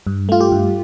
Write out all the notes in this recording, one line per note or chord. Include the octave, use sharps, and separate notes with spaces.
G2
A3 F4
G4
G2